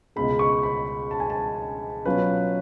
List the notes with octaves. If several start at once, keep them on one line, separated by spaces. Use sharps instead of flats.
C#2 B2 G#3 B5
C#6
B5
A5
G#5
A5
B2 F#3 C#4 F4 B4